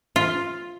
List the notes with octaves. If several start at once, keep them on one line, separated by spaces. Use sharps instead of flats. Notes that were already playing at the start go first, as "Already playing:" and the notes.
F4